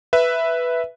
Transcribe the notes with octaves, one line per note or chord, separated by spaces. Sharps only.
B4 E5